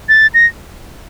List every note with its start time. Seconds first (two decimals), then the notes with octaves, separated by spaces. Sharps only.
0.09 A6
0.34 A#6